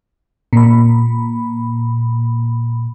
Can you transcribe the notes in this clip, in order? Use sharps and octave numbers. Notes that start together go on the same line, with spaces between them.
A#2 B5